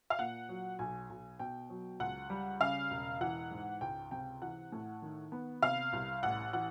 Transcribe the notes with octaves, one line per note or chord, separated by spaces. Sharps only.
F5
A#2 F#5
F#3
B1 G#5
B1
B2 G5
F#3
C#2 F#5
G3
C#3 F5
E1
E3 F#5
G#2
C#2 G5
C3 G5
E3 F#5
A2
D#3
B3
C3 F5
C2
A1 F#5
E3 F#5